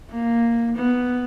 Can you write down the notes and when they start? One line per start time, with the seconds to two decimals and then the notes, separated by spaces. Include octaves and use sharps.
0.10 A#3
0.76 B3